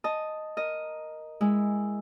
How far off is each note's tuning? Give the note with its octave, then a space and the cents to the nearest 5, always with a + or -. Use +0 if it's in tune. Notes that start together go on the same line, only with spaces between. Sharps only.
D#5 +0 A5 +0 D#6 +0
A#4 +0 D#5 +0
G#3 -10 E4 +0